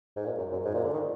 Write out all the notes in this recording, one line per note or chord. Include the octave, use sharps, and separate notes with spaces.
G#2
A#2
F#2
F#2
G#2
A#2
D3
D#3